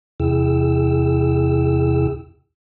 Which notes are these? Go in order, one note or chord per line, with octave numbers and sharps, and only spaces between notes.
E2 C3 E4 G#4 G5 E6